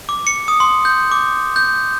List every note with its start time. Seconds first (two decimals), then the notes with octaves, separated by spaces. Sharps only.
0.09 D6
0.27 C#7
0.48 D#6
0.60 C6
0.85 G6
1.11 D6
1.56 G6